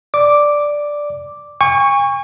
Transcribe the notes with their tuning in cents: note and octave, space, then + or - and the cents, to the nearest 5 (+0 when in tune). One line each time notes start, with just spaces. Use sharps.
D5 +0 D6 +0
G#5 -45 C#6 +0